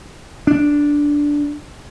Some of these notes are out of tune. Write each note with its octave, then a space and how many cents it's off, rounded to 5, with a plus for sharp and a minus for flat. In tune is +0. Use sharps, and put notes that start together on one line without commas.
D4 -5